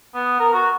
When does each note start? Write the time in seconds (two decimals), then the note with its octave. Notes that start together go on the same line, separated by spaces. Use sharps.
0.15 B3
0.40 A#4
0.54 F#4